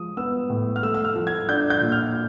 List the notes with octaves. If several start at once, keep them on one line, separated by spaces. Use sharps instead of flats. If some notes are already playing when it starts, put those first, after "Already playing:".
Already playing: F3 G#3 D#6
B3 E6
A2
F6
A3 E6
E6
F6
F3
G#6
D4 G6
G6
A#2
F6